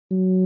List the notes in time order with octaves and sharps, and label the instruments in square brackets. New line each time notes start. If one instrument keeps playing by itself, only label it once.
[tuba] F#3